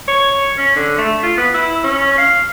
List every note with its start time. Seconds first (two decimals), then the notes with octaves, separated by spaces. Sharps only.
0.08 C#5
0.58 C#4
0.76 D3
0.98 A3
1.23 F4
1.37 B3
1.54 E4
1.84 C#4
2.18 F5